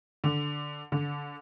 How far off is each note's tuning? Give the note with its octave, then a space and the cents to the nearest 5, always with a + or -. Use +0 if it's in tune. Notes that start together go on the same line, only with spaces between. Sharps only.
D3 +0
D3 -20